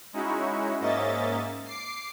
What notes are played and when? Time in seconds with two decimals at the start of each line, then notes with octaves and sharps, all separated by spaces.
0.13 G#3 C#4 D#4 E4 F#4
0.80 G#2 A#3 C#4 D#5 E5 A6
1.65 D6 C7